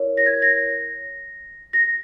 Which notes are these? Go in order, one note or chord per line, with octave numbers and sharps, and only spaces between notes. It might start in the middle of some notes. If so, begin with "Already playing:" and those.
Already playing: E4 A#4 C#5
A#6
G#6
A#6
A#6